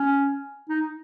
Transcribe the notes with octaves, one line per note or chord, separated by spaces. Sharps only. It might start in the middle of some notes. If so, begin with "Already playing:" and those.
Already playing: C#4
D#4